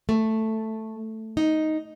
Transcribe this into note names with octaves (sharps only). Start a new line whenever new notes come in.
A3
D#4